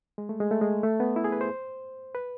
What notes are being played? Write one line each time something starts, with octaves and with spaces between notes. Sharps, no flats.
G#3
A3
G#3
A3
G#3
A3
B3
E4
G#4
B4
C5
B4